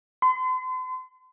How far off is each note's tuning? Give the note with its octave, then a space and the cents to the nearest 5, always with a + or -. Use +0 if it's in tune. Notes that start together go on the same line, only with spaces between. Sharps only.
C6 -40